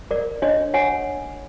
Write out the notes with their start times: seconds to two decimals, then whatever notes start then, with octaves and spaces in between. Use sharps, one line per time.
0.11 A#4 D5
0.42 D4 C#5 D#5
0.74 C#5 F#5 G#5